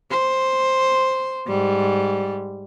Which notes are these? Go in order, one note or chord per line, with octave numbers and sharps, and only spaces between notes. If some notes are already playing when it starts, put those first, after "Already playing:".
C5
G#2 G3